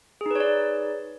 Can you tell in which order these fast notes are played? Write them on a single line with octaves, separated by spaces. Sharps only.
G#4 D#4 B4 C#5 D5